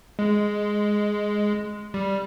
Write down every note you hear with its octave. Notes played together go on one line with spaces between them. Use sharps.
G#3
G3